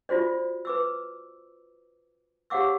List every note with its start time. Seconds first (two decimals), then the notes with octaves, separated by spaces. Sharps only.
0.09 F4 F#4 C5 D5
0.65 B4 D6 E6
2.50 G4 C#5 F5 F#5 D6 E6